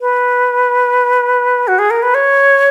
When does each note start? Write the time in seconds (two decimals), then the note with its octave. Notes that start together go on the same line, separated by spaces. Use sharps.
0.01 B4
1.68 F#4
1.79 G#4
1.91 A#4
2.03 B4
2.15 C#5